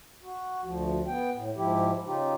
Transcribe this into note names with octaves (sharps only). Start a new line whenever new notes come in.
F#4
D2 F3
B3 G5
A2
G#2 F3 E4 G4
C#3 D#4 F4 G4